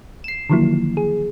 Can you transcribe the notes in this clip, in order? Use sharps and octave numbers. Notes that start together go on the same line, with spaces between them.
C7 E7
D3 D#3 F3 F#3 A#3 E4
G#4